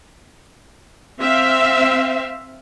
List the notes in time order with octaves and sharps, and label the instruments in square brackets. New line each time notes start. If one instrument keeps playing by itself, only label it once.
[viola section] C4 E5 F5